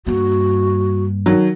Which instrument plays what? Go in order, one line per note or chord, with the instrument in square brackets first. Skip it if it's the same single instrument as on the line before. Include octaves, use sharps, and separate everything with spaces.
[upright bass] G2 A#3 [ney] F#4
[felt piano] D#3 F#3